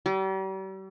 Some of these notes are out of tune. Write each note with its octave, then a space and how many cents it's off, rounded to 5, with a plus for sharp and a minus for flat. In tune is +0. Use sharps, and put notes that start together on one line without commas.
G3 -40